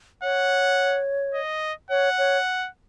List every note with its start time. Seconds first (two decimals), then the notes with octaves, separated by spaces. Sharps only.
0.23 C#5 F#5
1.34 D#5
1.90 C#5 F#5
2.18 C#5